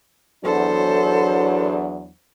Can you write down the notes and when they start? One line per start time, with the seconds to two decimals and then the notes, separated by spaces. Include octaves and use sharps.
0.44 E2 F#3 D4 A4 C5